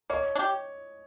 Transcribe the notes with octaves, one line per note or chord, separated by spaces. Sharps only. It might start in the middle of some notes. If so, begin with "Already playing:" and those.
A#3 C#5 D#5
D4
G4